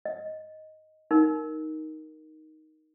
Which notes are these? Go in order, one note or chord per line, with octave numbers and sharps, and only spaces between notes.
D#5
D#4 A#4